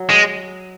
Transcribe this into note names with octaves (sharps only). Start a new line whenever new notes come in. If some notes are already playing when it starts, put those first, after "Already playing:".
Already playing: F#3
G#3